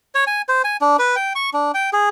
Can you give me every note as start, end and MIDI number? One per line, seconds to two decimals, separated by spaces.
0.15 0.24 73
0.27 0.42 80
0.49 0.62 72
0.64 0.77 80
0.81 0.97 62
0.99 1.16 71
1.16 1.33 79
1.35 1.50 85
1.53 1.72 62
1.74 1.90 79
1.93 2.09 68